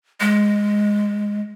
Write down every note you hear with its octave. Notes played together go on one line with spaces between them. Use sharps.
G#3